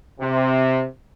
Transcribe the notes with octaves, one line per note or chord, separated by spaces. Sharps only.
C3